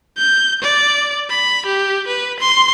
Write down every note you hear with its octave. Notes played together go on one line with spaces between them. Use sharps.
G6
D5
B5
G4
B4
C6